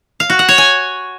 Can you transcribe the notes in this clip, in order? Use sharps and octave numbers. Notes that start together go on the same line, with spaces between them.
F5
F#4
F#5
C#5
G#5